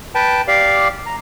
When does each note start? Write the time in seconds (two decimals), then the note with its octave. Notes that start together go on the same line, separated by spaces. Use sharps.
0.15 B4 G5 A5
0.48 G4 D5 F5
1.06 A#5